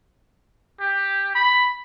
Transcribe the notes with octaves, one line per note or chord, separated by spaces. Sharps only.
G4
B5